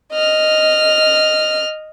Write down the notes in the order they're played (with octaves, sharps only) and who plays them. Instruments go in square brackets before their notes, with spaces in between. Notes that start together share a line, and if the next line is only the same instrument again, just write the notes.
[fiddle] D#5 F6